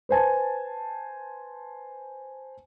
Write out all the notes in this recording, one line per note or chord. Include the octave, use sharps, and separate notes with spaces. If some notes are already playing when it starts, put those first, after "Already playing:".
B4 C5 G#5 A5